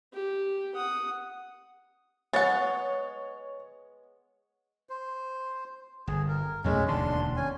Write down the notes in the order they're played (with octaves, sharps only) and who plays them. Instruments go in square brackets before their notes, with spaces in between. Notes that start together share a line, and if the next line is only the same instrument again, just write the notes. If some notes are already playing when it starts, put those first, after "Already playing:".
[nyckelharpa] G4
F#5 D#6
[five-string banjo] G#3 B3 F#5 [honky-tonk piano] C#5 A6
[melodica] C5
[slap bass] G1 [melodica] G#4
[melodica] A#4
[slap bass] B1 F2 A3 [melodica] G#3 C#4
[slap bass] E1 D#2 D3 [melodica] D4 C6
[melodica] C#4 G#5